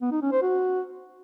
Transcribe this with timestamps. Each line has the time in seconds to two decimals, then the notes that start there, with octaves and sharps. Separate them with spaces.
0.02 B3
0.12 D#4
0.22 C#4
0.32 C5
0.42 F#4